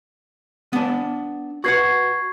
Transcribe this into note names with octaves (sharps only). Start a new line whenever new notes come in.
B3 D4
F#4 B4 F#5 C#6 G#6 C7